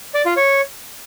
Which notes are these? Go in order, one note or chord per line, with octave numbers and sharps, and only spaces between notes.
D5
F4
C#5